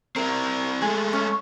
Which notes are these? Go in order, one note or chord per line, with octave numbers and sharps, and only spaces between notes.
C4 E4 A#4
G#3 A3 G#4
C#4